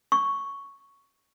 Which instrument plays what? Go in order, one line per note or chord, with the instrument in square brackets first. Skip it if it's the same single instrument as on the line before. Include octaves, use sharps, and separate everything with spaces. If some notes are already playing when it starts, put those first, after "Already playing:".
[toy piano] C#6